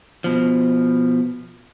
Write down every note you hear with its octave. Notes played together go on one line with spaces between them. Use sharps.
B2 F3